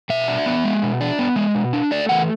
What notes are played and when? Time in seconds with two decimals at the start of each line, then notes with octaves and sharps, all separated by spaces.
0.10 B2 E5
0.28 D4
0.46 B3
0.65 G#3
0.83 B2
1.01 D4
1.19 B3
1.36 G#3
1.55 B2
1.73 D4
1.91 A3 D5
2.09 E3 F#5